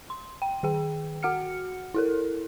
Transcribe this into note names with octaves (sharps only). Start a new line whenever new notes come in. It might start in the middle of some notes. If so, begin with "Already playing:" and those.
C6
G5
D#3 G#4 G5
F#4 F#5 F6 C#7
E4 A4 A#4